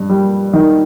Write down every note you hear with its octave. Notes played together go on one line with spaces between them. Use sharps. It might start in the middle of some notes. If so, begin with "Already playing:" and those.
Already playing: G2
G3
D#3